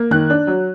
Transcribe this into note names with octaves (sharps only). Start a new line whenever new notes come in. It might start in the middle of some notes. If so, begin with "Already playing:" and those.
Already playing: A#3
D#3 F#6
D4
F#3